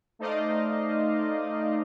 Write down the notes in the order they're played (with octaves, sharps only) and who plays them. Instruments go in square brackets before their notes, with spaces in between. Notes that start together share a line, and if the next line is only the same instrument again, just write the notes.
[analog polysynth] A3 D#4 C5 D5 D#5 F5